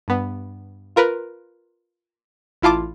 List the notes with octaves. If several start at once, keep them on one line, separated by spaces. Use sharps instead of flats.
G2 B3
F4 A#4 B4
A1 E4 F4 A5 D6